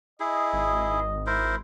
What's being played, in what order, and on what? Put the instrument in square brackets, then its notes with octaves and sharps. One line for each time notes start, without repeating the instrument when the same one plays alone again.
[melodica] E4 G#4 [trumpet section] D#5
[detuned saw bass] G#1
[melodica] E4 A#4 C5